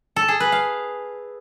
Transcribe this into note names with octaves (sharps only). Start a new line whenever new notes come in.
A4
G#4
B4
F5